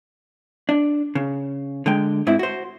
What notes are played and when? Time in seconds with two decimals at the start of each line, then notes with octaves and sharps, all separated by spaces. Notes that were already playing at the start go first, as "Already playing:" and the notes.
0.69 D4
1.15 C#3
1.86 D3 G#3 G5
2.27 G#2 C4 E4
2.39 F#4 C5